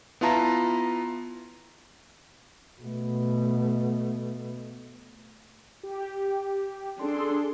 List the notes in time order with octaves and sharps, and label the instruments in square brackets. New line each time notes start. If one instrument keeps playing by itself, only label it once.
[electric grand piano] B3 E4 F4 A5 A#5
[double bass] B2 A3
[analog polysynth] G4
[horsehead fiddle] D4 [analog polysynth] G#4 A4 C6